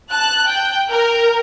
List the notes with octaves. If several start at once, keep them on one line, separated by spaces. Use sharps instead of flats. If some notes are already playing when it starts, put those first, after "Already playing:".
A5 F#6
G5
A#4